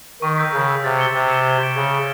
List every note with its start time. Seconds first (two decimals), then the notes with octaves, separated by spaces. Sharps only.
0.22 D#3 C#6
0.38 E6 G6 B6
0.52 C#3 C#6
0.68 E6 G6 B6
0.84 C3 A6
0.99 C#7 E7 G7
1.14 C3 A6
1.30 C#7 E7 G7
1.46 G#6
1.61 B6 D7 G7
1.76 C#3 G#6
1.93 B6 D7 G7